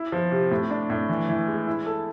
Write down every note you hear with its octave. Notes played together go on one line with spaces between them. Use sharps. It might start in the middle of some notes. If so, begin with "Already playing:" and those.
Already playing: E4
F3
C3
A2
D4
A2
E3
E3
G#3
E4
A4